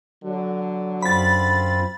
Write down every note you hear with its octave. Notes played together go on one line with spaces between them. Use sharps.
D3 F#3
F#2 C4 F4 B5 A6